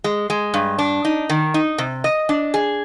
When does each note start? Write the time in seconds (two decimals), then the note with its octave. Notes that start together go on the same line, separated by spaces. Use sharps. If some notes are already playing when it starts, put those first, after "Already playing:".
0.04 G#3
0.30 G#3
0.54 G2
0.79 D4
1.05 D#4
1.30 D#3
1.54 D#4
1.78 C3
2.04 D#5
2.29 D4
2.54 G#4